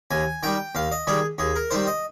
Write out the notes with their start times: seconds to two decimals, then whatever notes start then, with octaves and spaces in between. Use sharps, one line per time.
0.11 D#2 G#5
0.43 D#3 G3 G5
0.75 D#2 F5
0.92 D#5
1.07 D#3 G3 G#4
1.38 D#2 G#4
1.56 A#4
1.71 D#3 G3 C5
1.87 D#5